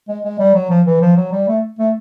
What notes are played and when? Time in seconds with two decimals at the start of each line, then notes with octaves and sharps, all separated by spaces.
0.08 G#3
0.24 G#3
0.39 G3
0.55 F#3
0.70 F3
0.86 E3
1.01 F3
1.16 F#3
1.32 G3
1.48 A3
1.79 A3